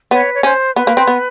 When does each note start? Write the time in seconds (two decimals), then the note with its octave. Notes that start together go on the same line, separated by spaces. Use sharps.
0.11 B3 B4 C#5
0.34 C#5
0.43 C#4 C5
0.76 B3 B4
0.87 A#3
0.97 C4
1.07 B3